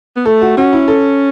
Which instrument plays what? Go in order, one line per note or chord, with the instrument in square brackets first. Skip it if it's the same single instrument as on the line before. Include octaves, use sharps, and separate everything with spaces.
[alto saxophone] B3
[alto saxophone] A3 [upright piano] A4
[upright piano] F#4
[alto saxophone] C#4 [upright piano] F#4
[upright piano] E4
A4